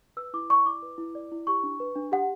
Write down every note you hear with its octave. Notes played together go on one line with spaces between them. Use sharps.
B4 E6
E4 D6
D5 C#6
E4 D6
B4
E4
D5
E4
G4 C#6
D4
B4
D4
G4 F#5